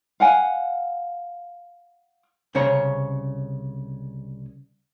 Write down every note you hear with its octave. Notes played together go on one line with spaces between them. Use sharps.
F5 F#5 G#5
C2 C#3 C5 C#5 A#5